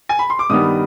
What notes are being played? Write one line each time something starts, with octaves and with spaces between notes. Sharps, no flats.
G#5
B5
C6
D6
G2 D#3 G3 B3 D#6